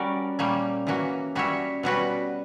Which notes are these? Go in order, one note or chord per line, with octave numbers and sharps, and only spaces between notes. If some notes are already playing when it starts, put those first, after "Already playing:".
Already playing: G3 C#4 F#4 A#4 D5
A#2 G3 A#3 C#4
E3 A#3 C#4 F#4
G3 C#4 F#4 C#5 E5
B2 G3 C#4 F#4 B4